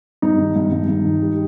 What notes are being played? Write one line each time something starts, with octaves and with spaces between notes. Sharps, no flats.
G2 D#4
D#3
G2
G2
G2
D#3
G3